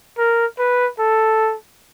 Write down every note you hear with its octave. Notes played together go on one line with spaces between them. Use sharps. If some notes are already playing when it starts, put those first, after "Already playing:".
A#4
B4
A4